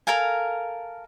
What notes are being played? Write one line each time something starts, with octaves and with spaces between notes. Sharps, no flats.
A4 A#4 F5 G#5